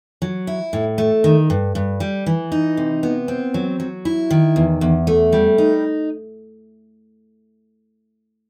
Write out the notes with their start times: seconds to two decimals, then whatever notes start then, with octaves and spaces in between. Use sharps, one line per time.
0.22 F#3
0.47 E4
0.73 A2
0.98 A3
1.24 D#3
1.50 G2
1.75 G2
2.00 G3
2.26 E3
2.52 D#4
2.77 C3
3.03 B3
3.28 C4
3.54 F#3
3.80 F#3
4.05 E4
4.31 D#3
4.56 E2
4.81 E2
5.07 A3
5.32 G3
5.58 D#4